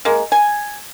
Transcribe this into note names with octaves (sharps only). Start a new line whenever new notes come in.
G#3 A#3
G#5